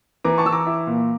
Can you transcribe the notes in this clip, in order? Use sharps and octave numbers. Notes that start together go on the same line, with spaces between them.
E3 A#5 D6
A5 C#6
E3 E6
A#5 D6
E4
A#2